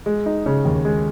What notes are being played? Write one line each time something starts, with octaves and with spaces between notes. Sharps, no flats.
G#3
D#4
C#3
D#2
G#3